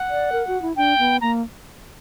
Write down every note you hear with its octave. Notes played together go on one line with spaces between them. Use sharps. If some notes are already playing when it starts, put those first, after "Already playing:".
Already playing: F#5
D5
A#4
F#4
E4
D4 G5
B3
A#3 A#5